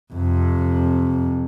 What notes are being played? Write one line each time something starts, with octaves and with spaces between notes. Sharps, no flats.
F2 C3